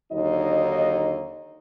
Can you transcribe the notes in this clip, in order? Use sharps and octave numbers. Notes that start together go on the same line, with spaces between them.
D#2 D3 F#3 D#4 D#5